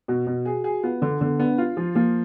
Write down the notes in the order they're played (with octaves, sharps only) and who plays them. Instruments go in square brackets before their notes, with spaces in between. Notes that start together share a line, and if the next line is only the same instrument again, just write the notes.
[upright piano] B2 [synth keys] F#4
[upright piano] B2
G#4
G#4
[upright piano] B3 [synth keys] F4
[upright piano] D3 [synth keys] D4
[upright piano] D3 [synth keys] B3
[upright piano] B3 [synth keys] D4
[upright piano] F4
F3
[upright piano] F3 [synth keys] A#3